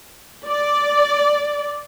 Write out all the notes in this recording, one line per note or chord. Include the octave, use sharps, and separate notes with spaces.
D5